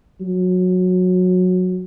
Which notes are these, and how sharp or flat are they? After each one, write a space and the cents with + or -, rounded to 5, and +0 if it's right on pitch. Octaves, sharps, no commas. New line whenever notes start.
F#3 -20